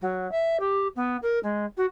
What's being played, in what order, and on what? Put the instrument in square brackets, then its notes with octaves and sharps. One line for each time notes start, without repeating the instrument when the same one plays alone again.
[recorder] F#3
E5
G4
B3
A#4
G#3
F#4